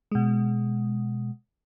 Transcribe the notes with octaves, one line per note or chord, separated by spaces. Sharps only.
B2 G#3